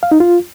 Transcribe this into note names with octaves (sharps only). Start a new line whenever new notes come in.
F5
D#4
F4